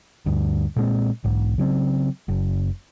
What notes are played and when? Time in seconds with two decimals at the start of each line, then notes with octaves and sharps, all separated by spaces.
0.26 D2 G2
0.76 A#2 G#3 A3 C4
1.24 B1 G#2
1.58 C#3 F#3 C4
2.28 F#1